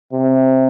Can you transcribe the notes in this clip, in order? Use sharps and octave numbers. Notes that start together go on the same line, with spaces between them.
C3